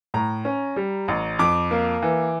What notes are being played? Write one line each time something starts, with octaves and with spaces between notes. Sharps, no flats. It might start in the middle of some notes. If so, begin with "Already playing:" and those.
A2 A#5
C#4
G3
A1
F2 D6
A#3
E3